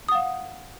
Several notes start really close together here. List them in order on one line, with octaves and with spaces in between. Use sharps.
D#6 F#5 F5